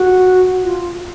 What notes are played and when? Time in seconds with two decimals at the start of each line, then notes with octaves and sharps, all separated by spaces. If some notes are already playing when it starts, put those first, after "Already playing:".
Already playing: F#4
0.63 F4